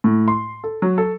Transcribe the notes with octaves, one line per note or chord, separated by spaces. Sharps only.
A2
C6
A4
F#3
A4